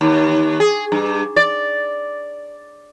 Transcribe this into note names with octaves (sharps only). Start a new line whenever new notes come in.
D#2
G#4
G2
D5